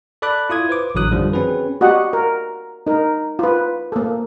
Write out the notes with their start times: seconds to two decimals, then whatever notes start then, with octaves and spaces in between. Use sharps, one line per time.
0.22 A4 D5 B5 D6 F#6
0.50 E4 F4 D#6 G#6
0.69 B4 C5 D6
0.95 A1 D3 F#3 D#6 F#6
1.11 F#2 D3 D#3 F3 G3
1.33 C4 C#4 F#4 G#4 B4
1.81 F#4 G4 D#5 F#5
2.13 A#4
2.87 D#4 A#4
3.39 F4 B4
3.92 A#3 A4